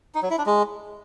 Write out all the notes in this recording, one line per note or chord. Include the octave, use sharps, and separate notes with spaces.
D#4
F#3
E4
D4
G#3